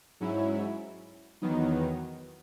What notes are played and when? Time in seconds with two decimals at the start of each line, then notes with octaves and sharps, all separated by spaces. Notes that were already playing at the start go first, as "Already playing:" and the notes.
0.20 G#2 F#3 C#4 E4
1.42 E2 D#3 F#3 B3 D#4